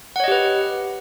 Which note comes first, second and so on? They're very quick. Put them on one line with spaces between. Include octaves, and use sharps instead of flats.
F#5 C#5 D#5 G4 B4